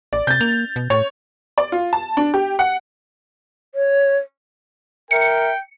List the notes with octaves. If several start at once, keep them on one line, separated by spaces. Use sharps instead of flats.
A1 D5
C3 G6 A6
A#3 F7
B2
A2 C#5
D5
F4
A5
D4
G4
F#5
C#5
A#4 E5 G5 C#7